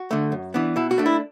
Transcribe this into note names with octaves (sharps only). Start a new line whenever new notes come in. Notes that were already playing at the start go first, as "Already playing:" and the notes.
Already playing: F#4
D3 A3
F#2
E3 B3 D4
B2 E4
F#4
A3 D4
E4